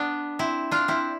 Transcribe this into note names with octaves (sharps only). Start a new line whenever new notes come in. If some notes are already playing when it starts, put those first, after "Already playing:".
Already playing: B3 D4
C4 E4
D4 F4
C4 E4